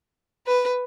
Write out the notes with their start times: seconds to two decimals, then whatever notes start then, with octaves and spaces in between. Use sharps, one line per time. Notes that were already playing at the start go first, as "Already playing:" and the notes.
0.47 B4